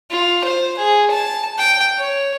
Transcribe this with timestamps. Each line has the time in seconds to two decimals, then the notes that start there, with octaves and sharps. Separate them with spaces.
0.11 F4
0.44 C5
0.78 G#4
1.10 A5
1.58 G5
1.98 C#5